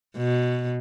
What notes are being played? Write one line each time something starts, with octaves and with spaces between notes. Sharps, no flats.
B2